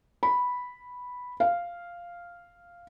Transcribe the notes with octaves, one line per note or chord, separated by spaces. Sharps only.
B5
F5